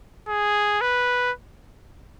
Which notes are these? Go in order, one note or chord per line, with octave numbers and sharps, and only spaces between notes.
G#4
B4